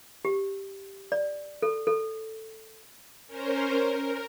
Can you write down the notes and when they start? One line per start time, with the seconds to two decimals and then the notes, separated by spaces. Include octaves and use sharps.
0.25 G4
1.12 D5
1.62 A4
1.87 A4
3.27 C#4 A#4 C5
3.79 A#4